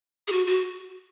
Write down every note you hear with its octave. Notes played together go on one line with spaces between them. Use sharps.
G#4
F#4
F#4